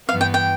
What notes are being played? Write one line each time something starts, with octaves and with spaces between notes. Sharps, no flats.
G2 E3 B3 F5
G5
G5